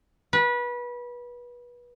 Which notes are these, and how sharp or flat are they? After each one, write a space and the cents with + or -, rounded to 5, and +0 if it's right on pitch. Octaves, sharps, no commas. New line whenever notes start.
B4 -25